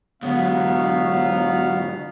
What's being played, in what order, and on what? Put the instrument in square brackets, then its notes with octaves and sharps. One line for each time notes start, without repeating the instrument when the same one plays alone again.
[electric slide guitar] G#2 D3 [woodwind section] F#3 B3 [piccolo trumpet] F5